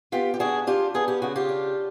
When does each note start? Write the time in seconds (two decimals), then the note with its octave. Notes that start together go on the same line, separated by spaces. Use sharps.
0.12 B3 F4 G4
0.34 G4
0.40 D4 F#4 G#4
0.67 D4 F4 G4
0.94 B3 G#4
1.08 G4
1.22 C#3 F#4
1.36 F4 G4
1.49 D4